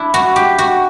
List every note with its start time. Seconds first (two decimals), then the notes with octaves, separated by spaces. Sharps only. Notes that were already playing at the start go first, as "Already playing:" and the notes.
Already playing: D4 E4
0.14 F#4
0.36 G4
0.58 F#4